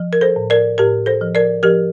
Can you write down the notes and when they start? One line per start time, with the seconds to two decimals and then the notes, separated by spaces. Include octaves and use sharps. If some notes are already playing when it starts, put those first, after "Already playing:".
Already playing: F3
0.13 A#4
0.21 A4 C5
0.36 A2
0.50 A#4 D5
0.78 A2 G4 A#4
1.06 A4 C5
1.21 F3
1.35 A#4 D5
1.63 F3 G4 A#4